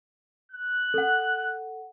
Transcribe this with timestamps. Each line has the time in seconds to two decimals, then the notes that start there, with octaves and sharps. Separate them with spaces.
0.51 F#6
0.94 A4 F#5